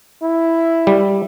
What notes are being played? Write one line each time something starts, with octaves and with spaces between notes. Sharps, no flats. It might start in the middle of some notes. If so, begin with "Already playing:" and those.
E4
G3